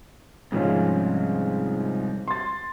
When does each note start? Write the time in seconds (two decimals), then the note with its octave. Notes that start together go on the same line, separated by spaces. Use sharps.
0.52 C2 G#2 F3 C#4
2.28 C6 A6